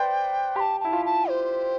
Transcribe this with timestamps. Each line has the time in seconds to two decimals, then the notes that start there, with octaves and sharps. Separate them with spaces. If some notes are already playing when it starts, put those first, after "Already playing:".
Already playing: B4 C5 D5 G5
0.56 G4 C6
0.60 A5
0.80 E4 A5
0.93 F4
1.06 A5
1.29 C5